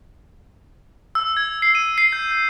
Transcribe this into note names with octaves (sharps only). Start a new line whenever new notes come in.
E6
G#6
C7
D#7
C7
G6
G6